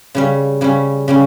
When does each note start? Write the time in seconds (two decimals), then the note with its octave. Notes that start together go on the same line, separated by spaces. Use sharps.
0.15 C#3 G3 C#4
0.61 C#3 G3 C#4
1.08 C#3 G3 C#4